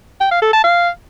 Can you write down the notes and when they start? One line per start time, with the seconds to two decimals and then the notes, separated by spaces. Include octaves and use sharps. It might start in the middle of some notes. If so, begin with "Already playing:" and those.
0.21 G5
0.31 F5
0.42 A4
0.53 A5
0.64 F5